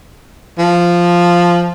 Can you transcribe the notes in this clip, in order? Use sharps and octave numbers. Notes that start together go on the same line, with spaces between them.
F3